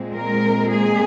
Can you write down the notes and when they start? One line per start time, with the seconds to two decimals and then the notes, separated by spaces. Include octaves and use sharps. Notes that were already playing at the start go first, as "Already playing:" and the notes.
Already playing: A#2 G#3 C4
0.16 A#4
0.70 G#4